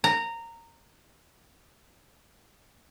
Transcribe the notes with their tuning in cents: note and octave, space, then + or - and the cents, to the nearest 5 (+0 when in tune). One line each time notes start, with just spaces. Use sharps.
A#5 -15